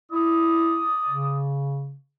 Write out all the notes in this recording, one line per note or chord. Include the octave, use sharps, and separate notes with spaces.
E4 D5 D#6
C#3